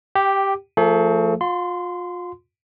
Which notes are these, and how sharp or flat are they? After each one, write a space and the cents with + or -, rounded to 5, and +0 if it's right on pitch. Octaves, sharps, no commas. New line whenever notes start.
G4 +0 G5 -20
F3 +0 A3 +40 A4 -45
F4 +35 C6 -20